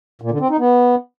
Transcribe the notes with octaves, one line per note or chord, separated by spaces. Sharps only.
A#2
D3
C4
D#4
B3